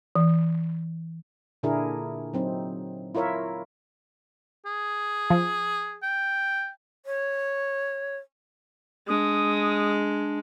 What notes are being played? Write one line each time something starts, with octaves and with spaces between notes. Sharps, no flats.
E3
A#2 D3 D4 E4 G#4 A#4
F#3 C4 D#4
E4 F4 A#4 C#5 E5
G#4
F3
G5
C#5
G#3 D4 D#6